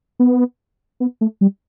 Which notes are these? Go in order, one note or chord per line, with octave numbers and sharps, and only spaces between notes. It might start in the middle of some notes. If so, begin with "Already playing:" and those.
B3
B3
A3
G3